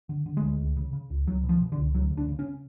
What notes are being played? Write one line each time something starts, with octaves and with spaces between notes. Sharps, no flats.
D3
D3
G#3
D2
C#2
C#3
C#3
C#2
C#2 F#3
B2
F3
B2
D3
C#2
D2 F#3
C#3
D4
C#3
C#4